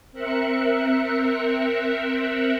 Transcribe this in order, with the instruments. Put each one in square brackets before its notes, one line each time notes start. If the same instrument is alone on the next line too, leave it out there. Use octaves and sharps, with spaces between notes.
[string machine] C4 A#4 E5 F#6 C#7